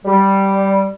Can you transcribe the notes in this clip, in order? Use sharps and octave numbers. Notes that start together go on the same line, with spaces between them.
G3